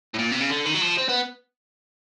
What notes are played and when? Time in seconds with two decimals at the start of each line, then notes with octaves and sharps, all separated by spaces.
0.14 A2
0.19 A#2
0.32 C3
0.41 C#3
0.50 D3
0.66 D#3
0.75 F#3
0.81 F3
0.98 C4
1.09 B3